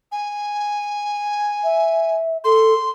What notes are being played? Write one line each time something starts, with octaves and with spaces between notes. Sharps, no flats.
G#5
E5
A4 C6